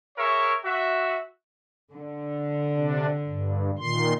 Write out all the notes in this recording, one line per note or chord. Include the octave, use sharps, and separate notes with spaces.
G#4 A#4 C#5 E5 C#6
F#4 E5
D3
C3 D4
G2
A#2 D#3 C6